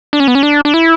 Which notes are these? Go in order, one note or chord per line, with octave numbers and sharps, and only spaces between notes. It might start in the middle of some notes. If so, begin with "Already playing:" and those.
D4
C#4
B3
C#4
D4
D4
E4